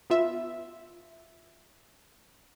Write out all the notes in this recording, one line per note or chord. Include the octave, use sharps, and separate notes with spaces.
B3 F4 E5